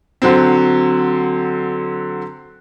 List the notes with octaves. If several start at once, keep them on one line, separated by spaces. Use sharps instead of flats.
D3 F#3 C4